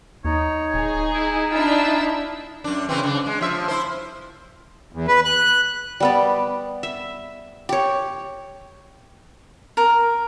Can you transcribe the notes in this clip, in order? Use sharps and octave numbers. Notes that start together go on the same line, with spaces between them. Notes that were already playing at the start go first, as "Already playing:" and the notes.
D#2 D#4 C#5
D1 G#4
E4
D4 E4 F4 E6
F#2 D4
C#3 E3 C4
C#3 D4
G#3
F3 E5
E4 C5
E2
B4
F#6
G3 B3 D5
E5
G4 C#5
A#4